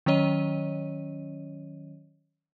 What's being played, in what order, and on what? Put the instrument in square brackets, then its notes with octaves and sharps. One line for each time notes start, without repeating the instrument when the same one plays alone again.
[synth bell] D#3 F#3 C#4 C#5 D#5 D#7